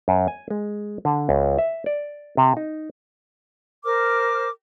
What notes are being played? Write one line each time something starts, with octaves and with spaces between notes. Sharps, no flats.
F#2
G#5
G#3
D3
C#2
E5
D5
C3
D#4
A#4 C5 D6 F6